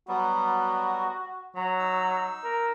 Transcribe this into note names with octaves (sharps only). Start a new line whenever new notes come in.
F#3 G3 B3 F#4
F#3 A#5
D#4 E6
A#4